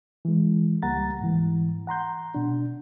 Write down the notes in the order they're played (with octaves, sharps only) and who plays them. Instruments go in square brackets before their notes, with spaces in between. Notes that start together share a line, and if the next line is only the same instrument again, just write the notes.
[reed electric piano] E3 G#3
C#2 G3 A#3 F#5 A#5 A6
G#2 E3
F#5 A#5 C6 G6
B2 D4